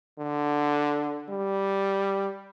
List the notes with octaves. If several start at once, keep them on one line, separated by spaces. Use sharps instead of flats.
D3
G3